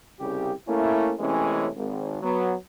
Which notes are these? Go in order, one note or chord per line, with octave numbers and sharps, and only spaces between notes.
C2 C#3 G4
A3 A#3 C#4 E4
C3 E3 G#3 A3 C#4
G#1
F#3 B3